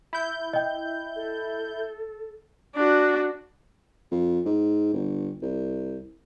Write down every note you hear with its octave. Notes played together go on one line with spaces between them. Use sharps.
E4 G6
D#5 G5
A4
D4 F#4
F2
G#2
G1
C2